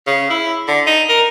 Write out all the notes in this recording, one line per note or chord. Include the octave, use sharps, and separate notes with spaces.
C#3
E4
D3
D#4
A#4